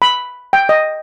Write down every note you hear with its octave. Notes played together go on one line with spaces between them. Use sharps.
B5
G5
D#5